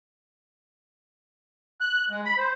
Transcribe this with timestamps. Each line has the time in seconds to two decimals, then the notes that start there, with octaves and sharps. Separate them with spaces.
1.81 F#6
2.10 G#3
2.25 B5
2.38 C5